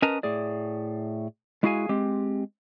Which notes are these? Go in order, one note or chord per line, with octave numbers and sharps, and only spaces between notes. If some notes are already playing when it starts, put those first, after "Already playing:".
C#4 A#4 B4 D#5 A5 A#5
A2 G#4 D5
G#3 E4 F#4 G#4 F5 G#5
G#3 C4 G4